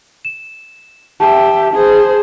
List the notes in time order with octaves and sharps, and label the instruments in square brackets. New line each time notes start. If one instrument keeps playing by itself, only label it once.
[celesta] E7
[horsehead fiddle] G4 E5 [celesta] A5
[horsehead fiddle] G#4 C5